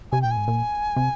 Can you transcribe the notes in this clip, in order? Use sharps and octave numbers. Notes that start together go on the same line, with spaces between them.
C3 G#5
A#2 G5
G#5
G#2
A#2
C3